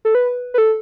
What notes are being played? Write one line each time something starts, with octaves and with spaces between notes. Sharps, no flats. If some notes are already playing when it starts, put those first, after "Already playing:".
A4
B4
B4
A4